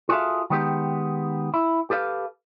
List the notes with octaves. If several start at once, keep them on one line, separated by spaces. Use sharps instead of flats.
F4 F#4 G#4 A4 E5 F5
D#3 G3 G#3 B3 D#4 G4
E4
G4 A4 B4 E5 F5